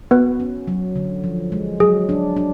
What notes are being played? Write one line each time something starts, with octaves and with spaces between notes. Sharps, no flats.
B3 F#4 B4
C#4
F#3
D3
F3
G#3
F#3 G#4
D4
D4